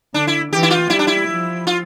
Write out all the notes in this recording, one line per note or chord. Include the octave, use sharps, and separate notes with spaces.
D3 D4
E4
E3 G4
E4
F4
G3 E4
D4
E4
F3
F4